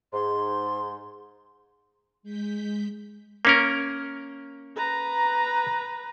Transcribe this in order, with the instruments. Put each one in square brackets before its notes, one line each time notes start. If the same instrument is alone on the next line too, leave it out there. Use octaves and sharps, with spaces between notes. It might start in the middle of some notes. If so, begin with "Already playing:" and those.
[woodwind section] G#2 [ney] C6
[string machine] G#3 G6 B6
[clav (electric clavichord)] A#3 C#4 A#4
[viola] B4 A#5